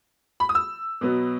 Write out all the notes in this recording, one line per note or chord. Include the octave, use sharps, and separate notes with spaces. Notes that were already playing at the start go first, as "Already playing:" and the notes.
B5
D#6
E6
B2 F#3 B3